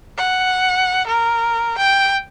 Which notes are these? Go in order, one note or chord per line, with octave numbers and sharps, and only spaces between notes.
F#5
A#4
G5